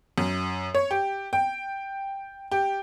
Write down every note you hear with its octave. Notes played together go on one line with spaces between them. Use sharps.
F#2
C#5
G4
G5
G4